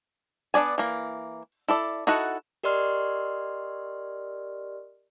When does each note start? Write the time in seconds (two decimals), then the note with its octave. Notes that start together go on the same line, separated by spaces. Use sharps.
0.54 B3 D4 D5 G#5
0.78 E3 A#3
1.68 E4 A4 D5
2.07 D#4 E4 F#4 A4 F#5
2.64 G4 A#4 D5 D#5 C6 F6